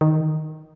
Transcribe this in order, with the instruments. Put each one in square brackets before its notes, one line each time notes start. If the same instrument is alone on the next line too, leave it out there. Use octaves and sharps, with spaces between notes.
[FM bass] D#3